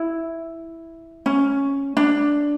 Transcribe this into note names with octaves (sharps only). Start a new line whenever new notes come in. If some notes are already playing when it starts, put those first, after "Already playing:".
Already playing: E4
C#4
D4